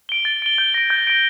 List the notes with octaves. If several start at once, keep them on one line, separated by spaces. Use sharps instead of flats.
D7 G7
A6
D7 G7
G6
A#6 D7
G6
A#6 D7